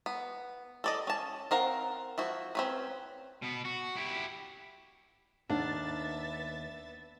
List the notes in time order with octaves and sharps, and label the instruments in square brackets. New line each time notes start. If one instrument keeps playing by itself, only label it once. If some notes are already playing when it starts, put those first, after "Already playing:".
[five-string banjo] B3
A4 D5 D#5
C#4 A5
C4 A#4 F5 F#5
F3 E4 F#4
C4 C#4 B4
[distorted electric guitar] B2 B3
F#4
E4 G4
[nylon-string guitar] D#2 F#5 [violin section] B3 E5 A6 [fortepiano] D4